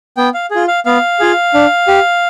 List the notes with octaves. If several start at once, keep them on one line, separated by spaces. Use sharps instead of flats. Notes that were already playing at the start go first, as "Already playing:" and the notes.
B3 G5
F5
F4 G#4
F5
B3 F5
F4 G#4
D4
G4